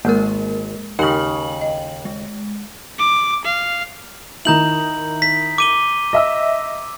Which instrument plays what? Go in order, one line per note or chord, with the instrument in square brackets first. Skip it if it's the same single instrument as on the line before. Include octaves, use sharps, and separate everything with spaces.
[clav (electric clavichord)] G#1 [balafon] G#3 [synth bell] A#3 A#4
[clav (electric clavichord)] D#2 C#3 [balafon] D#4 G4 A#4 [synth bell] G5 F#7
[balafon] D#5
[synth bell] G#3
[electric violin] D6
F5
[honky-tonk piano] D#3 D#4 E4 [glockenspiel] A#5 G6 F#7
[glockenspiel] B6
D6 D#7 G7
[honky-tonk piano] D#5 E5 E6